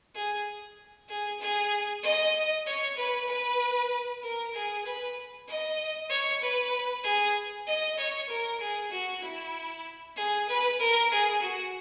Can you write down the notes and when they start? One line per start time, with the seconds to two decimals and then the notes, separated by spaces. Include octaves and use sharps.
0.15 G#4
1.09 G#4
1.41 G#4
2.03 D#5
2.66 C#5
2.97 B4
3.28 B4
4.23 A#4
4.54 G#4
4.85 B4
5.48 D#5
6.09 C#5
6.42 B4
7.04 G#4
7.67 D#5
7.98 C#5
8.29 A#4
8.60 G#4
8.91 F#4
9.22 E4
10.17 G#4
10.49 B4
10.80 A#4
11.11 G#4
11.41 F#4